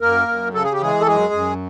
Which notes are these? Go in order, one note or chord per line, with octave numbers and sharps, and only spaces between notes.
F#2 A#3 A#4
F#2
C#3 A4
G#4
G4
E3 G#3 G#4
A4
F#2 G#3 G#4
F#2